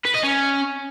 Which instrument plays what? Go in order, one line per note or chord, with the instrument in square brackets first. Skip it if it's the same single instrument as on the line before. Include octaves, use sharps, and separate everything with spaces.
[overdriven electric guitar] B4
D#5
C#4